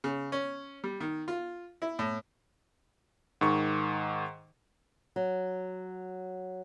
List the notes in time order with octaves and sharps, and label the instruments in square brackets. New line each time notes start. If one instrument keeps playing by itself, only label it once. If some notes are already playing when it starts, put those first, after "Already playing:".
[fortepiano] C#3
C#4
G3
D#3
F4
E4
A2
[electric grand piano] G#2 D#3 C#6
[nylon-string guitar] F#3